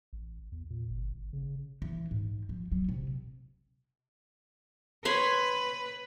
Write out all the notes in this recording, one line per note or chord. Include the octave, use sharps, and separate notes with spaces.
A1
E2
A#2
G1
G1
C#3
E3
G#2
F3
F#3
C3
B4 C#5 B5 C6